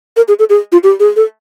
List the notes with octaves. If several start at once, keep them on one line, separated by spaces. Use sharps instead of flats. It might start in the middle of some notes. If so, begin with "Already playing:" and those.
A#4
G#4
A4
G#4
F4
G4
G#4
A4